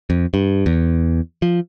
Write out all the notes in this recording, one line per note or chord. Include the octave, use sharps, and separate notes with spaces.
F2
G2
E2
F3